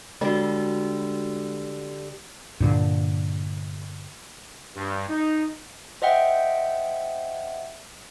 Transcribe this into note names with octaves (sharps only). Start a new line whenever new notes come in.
D3 G3 G#3 F#4
G2 A#2 D3
G2
D#4
C5 D#5 E5 F#5 G5